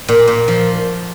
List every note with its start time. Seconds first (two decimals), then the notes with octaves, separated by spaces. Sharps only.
0.08 A#2
0.28 A#2
0.48 F3